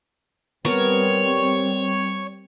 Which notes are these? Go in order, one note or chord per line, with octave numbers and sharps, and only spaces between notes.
G3 B3 C4 A#4 C#5 A5